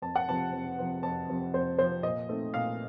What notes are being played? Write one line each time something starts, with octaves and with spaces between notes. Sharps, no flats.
F2 A5
F#5
C3 F3 C4 A5
F2
C3 F3 C4
F2 A5
C3 F3 C4
F2 C5
C3 F3 C4 C5
A#2 D#5
A3 C4 D#4
A#2 F5